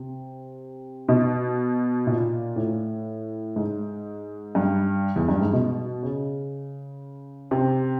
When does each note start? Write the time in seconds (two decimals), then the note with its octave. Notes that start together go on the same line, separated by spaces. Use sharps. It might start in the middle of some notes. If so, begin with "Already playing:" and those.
Already playing: C3
1.09 B2
2.07 A#2
2.56 A2
3.56 G#2
4.55 G2
5.16 E2
5.29 G2
5.41 G#2
5.53 B2
6.03 C#3
7.51 C3